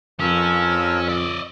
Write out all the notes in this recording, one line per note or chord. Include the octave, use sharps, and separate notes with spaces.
F2 F3 C#4 A#4 E6
D5 D#5